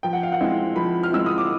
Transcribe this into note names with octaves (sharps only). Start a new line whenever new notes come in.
F3 G5
F#5
F5
F#5
G#3 C4 E4
F3 B5
F6
G#3 C4 E4 E6
D#6
D6